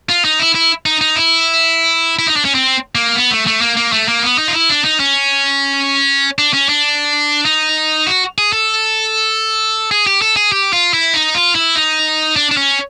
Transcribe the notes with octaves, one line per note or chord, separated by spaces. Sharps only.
F4
D#4
E4
E4
D#4
D#4
E4
E4
D#4
D4
C#4
C4
A#3
B3
A3
A3
A#3
A#3
A3
A#3
B3
D#4
F4
E4
D4
D#4
C#4
D4
C#4
D4
D#4
F#4
G#4
A4
G#4
G4
A4
G#4
G4
F4
E4
D#4
F4
E4
D#4
D4
D4
C#4